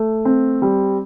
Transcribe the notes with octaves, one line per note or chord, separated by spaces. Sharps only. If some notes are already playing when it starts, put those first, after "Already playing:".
Already playing: A3
C4
G3